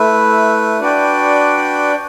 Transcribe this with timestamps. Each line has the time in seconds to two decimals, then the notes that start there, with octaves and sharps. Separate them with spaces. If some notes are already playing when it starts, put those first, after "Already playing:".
Already playing: A3 E4 B4
0.80 D4 F#4 B4 D5 G5